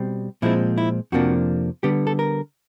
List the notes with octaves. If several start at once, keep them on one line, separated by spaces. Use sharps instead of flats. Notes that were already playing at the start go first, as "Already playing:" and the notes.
Already playing: B2 G3 C4
A#2 F3 G#3 C4 E4
E4
F2 C3 F3 A#3 D4 F#4
D3 G3 B3 G4
A4
A#4